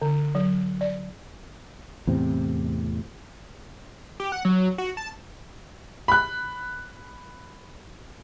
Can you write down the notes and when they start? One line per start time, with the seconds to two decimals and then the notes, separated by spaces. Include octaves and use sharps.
0.02 D3
0.35 F#3
0.81 D5
2.07 E2 A2 C3 C4
4.20 G4
4.32 F#5
4.45 F#3
4.78 F#4
4.97 A5
6.08 B5 F#6